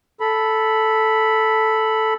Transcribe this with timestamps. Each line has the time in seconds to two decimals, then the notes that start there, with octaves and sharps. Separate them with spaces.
0.20 A4 B5